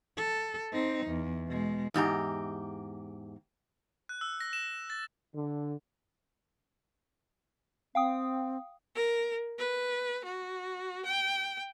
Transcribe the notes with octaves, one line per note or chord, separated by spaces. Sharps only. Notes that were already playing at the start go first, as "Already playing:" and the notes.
A4
C4 D#4
E2
B2 G#3
E2 G#2 G4 A#5
F#6
E6
A#6
E7
A6
D3
C4 F5 G5 D#6
A#4
B4
F#4
G5